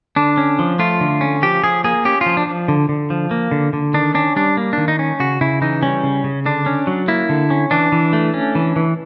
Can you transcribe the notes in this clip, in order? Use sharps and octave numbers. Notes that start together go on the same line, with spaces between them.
D3 D4
C#4
F3
A3 F4
D3
C#4
F3 G4
F3 G#4
A#3 G#4
C#4 G4
F4
F3
D4
F3
D3
D3
F3
A#3
D3
D3
D#3 D4
C#4 D4
G3 D4
A#3
D#3 D4
D#4
C#4
C#3 F#4
C#3 E4
E3 D#4
G3 C#4
C#3
C#3
D3 D4
C#4
F#3
A#3 E4
D3
C#4
E3 D4
E3
A3
C#4
E3
E3